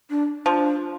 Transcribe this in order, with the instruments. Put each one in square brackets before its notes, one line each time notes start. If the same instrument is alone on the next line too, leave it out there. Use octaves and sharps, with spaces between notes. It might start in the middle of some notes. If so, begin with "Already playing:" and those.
[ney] D4
[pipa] F3 [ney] D4